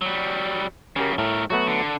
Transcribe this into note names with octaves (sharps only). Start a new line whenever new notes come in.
F#3 G3
F#2 C#3 C#4 G4 A#4
A2 A3 A#4
F#3 A3 B3 F#4
D3